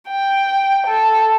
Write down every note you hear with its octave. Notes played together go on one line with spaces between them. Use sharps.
G5
A4